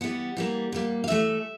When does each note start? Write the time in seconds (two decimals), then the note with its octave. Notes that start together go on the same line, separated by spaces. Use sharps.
0.01 E3 G3 B3 F#5
0.37 E3 G3 A#3
0.72 A#2 G3 A#3
1.04 F5
1.08 A2 E3 A3 E5